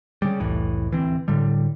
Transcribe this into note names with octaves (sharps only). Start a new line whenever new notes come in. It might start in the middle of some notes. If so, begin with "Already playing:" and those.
C#3 G3
F1 C2 A2 E3
D1 E3 C4
A2 D3 G3